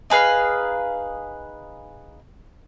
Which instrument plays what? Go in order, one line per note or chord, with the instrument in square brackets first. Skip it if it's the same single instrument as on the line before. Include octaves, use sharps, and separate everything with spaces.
[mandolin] D#4 G#4 B4 F5